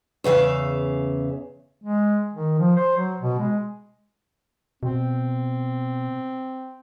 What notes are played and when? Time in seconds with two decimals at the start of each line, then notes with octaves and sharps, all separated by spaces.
0.24 E2 C#3 E5 F5
1.82 G#3
2.33 D#3
2.59 F3
2.76 C5
2.97 F#3
3.20 B2
3.39 G#3
4.83 B2 C4